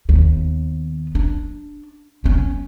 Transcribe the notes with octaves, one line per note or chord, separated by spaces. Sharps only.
D#2 B3
D4
B3 C#4